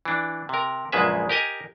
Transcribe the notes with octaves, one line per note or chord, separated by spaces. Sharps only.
E3 D4
C3 A#4
A#1 F#2 C#3 G#3 B4 E5
G4 A#4 D#5 G#5